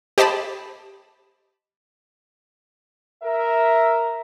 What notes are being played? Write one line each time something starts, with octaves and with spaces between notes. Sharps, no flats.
G4 C5 D#5 A5 B5 E7
A#4 E5